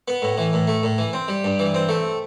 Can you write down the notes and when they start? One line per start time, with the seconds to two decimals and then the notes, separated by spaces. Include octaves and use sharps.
0.08 B3
0.22 A2
0.38 E3
0.53 A2
0.67 A3
0.83 A2
0.98 E3
1.13 C4
1.28 G3
1.44 G2
1.59 E3
1.75 C4
1.89 A3